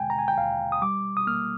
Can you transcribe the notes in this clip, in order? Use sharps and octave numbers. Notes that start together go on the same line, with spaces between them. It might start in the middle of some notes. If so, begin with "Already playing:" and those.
Already playing: D#2 D3 G#3 G5 G#5
A#5
G#5
G5
D#2 F5
D#6
G3 D6
D#6
A#3 F6